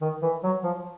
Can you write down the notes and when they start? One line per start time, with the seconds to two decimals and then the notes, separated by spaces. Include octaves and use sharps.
0.01 D#3
0.22 E3
0.44 F#3
0.64 F3